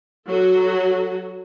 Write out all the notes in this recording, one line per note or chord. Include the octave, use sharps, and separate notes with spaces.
F#3 F#4 A4